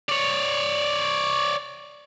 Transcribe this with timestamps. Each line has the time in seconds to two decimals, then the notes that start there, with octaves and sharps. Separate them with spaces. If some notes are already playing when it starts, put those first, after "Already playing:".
0.09 C#5 D5